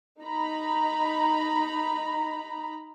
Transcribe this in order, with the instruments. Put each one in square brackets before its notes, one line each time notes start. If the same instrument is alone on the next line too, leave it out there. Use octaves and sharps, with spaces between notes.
[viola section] D#4 A#5 B5